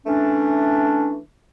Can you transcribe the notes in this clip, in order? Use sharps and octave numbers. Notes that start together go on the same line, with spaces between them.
E3 A3 C#4 D4